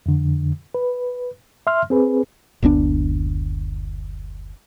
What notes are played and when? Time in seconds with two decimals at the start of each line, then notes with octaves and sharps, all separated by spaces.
0.06 F2 D3
0.75 B4
1.67 E5 C6 F6
1.90 C4 G#4 B4
2.62 F#1 D2 B3 D4